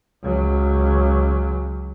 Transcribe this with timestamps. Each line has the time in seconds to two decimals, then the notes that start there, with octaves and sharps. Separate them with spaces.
0.23 C#2 F#3